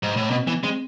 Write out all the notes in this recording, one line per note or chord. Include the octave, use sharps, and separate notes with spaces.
G#2
A2
B2 C4
E3 B3
G#3 C4